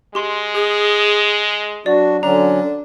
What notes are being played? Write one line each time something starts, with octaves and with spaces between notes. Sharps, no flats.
G#3 G4 C6
G#4
F#3 D4 F#4 D5
D3 F#3 C#4 D4 A#5